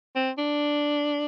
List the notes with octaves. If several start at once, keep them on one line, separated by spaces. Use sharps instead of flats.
C4
D4